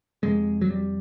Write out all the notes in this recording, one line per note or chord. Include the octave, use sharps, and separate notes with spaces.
F2 C3 G#3
F#3
G3